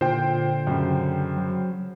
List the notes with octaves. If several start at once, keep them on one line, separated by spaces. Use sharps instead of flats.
A#2 D3 C5 G5
F#2 C#3
F#3